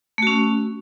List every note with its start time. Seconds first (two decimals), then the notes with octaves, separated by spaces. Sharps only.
0.18 A3
0.23 F#4
0.27 C#4